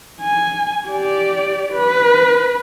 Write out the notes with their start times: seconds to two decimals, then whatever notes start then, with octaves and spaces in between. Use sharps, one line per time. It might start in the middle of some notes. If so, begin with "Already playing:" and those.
0.21 G#5
0.87 G4 D5
1.72 B4